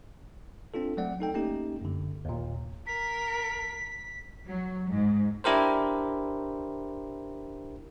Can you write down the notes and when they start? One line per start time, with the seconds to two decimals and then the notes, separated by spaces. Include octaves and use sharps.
0.74 C4 D4 F4 A4
0.97 F#3 A3 C4 D5 F#5
1.20 D#4 A4 G5
1.34 A3 A#3 C#4 D#4 G4
1.81 F#2 D3
2.25 D#2 A#2
2.87 A#4 B6
4.47 F#3
4.87 G#2
5.44 D4 E4 G4 A#4 C5